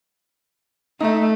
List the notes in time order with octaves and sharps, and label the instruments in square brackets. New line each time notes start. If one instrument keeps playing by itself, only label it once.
[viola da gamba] A3 [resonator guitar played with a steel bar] D#4 E5